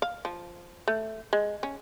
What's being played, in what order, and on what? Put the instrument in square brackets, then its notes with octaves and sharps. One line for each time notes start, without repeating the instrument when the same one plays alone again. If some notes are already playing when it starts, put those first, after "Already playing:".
[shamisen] F5
F3
A3
G#3
C#4